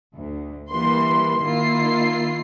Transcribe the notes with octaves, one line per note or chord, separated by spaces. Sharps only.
D2
E3 G3 A#3 B4 C6
D#3 A#3 E4 F4 C7